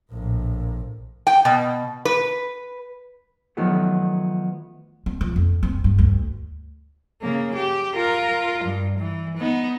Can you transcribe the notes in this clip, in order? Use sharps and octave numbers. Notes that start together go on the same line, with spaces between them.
A#1 A2
G5
B2
B4
D#3 F3 F#3 A3 B3
C4
F3
F2
C4
G2
D2
C#3 A#3
G4
F4 A#4
G2
E3
B3 D#4